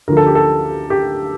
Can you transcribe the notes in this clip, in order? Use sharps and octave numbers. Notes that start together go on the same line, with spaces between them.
D2 D3 F3 A#4
A4
G4
A4
G4